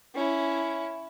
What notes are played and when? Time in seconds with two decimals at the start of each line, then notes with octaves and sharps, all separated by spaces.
0.15 C#4 E4